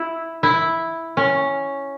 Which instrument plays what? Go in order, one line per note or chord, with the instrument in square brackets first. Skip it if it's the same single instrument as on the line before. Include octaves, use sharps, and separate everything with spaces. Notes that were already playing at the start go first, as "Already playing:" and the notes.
Already playing: [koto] E4
E4
C#4